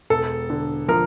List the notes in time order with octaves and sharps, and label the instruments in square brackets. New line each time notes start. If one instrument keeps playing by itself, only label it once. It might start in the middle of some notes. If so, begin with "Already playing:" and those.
[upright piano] E1 A4
D3
F3 A#4